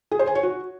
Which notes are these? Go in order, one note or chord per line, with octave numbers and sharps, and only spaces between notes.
G#4
C5
G#5
C#5
F#4